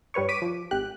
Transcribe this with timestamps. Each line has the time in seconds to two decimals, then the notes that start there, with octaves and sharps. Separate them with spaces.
0.14 G2 G3 B4 C#5 C#6
0.29 D6 B6 D7 D#7
0.42 F3
0.71 G#1 G4 F#6